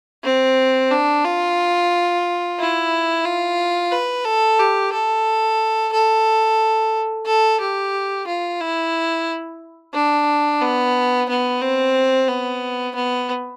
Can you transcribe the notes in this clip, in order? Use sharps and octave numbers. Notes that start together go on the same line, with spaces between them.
C4
D4
F4
E4
F4
B4
A4
G4
A4
A4
A4
G4
F4
E4
D4
B3
B3
C4
B3
B3